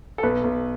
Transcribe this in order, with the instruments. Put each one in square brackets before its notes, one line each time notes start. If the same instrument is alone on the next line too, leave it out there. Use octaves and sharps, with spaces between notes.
[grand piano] A4
B1 B4
B1